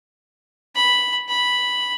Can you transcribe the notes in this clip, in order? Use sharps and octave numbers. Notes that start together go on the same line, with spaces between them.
B5
B5